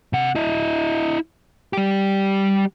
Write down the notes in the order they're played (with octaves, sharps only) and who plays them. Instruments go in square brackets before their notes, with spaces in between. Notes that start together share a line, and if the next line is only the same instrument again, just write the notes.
[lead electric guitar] C3 F#5
E4 D#5
G3 G4